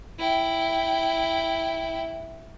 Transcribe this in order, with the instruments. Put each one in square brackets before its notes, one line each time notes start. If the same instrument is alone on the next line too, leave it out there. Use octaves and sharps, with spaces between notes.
[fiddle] E4 G5